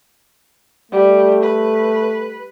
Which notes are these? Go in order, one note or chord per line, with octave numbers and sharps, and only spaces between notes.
G3 A3
B4